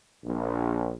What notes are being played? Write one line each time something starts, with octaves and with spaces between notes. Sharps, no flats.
A#1